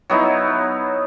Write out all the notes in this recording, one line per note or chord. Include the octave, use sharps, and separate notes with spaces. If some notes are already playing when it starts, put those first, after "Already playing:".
F#3 B3 D#4 E4